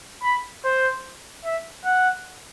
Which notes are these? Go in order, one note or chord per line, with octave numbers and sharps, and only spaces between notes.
B5
C5
E5
F#5